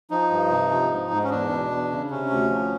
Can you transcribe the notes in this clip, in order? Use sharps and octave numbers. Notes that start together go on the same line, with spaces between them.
F3 D#4
G2
C3
F3
G#2
G#2
C#4
E2 D4
B2
E2
C#3
C3 C#4
D2
F3